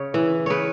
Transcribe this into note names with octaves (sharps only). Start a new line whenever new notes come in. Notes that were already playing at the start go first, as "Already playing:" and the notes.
Already playing: C#3 C#5
E3
C#3 B4 C#5